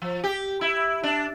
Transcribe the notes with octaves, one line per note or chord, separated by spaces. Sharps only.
F3
G4
E4
D4